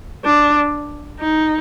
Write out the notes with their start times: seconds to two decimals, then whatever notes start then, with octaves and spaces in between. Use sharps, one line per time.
0.25 D4
1.20 D#4